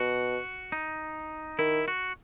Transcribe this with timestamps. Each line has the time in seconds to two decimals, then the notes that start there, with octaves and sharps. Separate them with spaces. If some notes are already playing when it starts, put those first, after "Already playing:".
Already playing: B2 F#4
0.72 D#4
1.58 D#3 E4
1.88 F#4